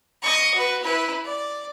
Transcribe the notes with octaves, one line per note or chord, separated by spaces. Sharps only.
D#5 C#6
F#4 B4
E4 B4
D5